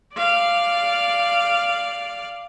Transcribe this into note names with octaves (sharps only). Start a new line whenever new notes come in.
D5 F5